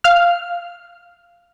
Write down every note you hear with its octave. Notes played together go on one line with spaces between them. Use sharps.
F5 F6